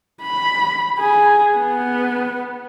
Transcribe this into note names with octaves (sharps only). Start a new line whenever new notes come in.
B5
G#4
B3